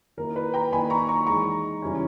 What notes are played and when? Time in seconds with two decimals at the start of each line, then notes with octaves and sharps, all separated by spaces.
0.17 D#3 A#3 E4 A#4
0.36 B4
0.54 G5 A#5
0.72 D#3 A#3 D#4 G#5 B5
0.90 A#5 C#6
1.08 A#5 C#6
1.27 E3 G#3 D#4 A#5 C#6
1.82 C#3 E3 G3 C#4 E4